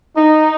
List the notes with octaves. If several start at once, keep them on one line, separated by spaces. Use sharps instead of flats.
D#4